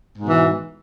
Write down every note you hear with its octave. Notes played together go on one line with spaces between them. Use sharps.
G#2 B2 E3